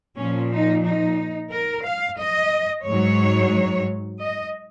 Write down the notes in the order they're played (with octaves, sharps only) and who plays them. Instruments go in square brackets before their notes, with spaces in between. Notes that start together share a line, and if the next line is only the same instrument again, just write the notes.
[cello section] A#2 F3 C#4
D#4
D#4
A#4
F5
D#5
G#2 F#3 C#5
D#5